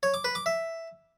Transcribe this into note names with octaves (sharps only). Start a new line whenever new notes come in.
C#5
D6
B4
D6
E5